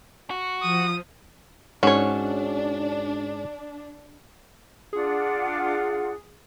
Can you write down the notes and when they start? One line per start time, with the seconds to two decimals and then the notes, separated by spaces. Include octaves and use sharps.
0.30 F#4
0.63 F3 D#6
1.83 G#2 C#4 D4 F#4 C#5
4.93 D4 F4 G#4 F#5